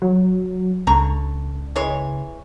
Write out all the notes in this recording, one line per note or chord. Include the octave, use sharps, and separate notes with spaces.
F#3
C#2 D3 A#5 C#6
E3 G#3 C#5